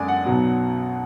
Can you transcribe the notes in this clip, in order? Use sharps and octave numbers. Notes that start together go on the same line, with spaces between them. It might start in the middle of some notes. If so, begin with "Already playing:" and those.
Already playing: F#2 D3 G#3 D5 G#5
F#5
B1 B2 F#3 B3